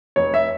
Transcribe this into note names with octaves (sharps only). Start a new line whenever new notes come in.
F1 C#5
E5